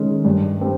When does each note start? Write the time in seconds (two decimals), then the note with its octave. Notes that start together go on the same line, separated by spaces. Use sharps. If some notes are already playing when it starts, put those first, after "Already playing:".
Already playing: D#3 G#3 C#4
0.25 G2
0.61 G3 C4